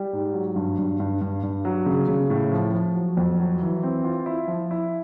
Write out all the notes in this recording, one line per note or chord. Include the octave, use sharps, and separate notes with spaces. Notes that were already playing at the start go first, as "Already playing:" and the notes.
Already playing: G3
G#2
F#3
G2
G2
G2
G2
G2
F#3
C#3
C#3
A2
F3
F3
F#3
F2
F#3
E3
C4
F4
E4
F3
E4